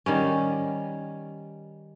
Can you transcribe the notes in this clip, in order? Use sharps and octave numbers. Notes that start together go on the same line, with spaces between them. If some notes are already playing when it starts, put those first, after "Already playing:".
D#3 G3 C#4